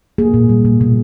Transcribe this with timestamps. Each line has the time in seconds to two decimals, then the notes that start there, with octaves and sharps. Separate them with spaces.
0.18 A#3 G#4
0.34 A#2
0.49 G3
0.65 A#2
0.81 B2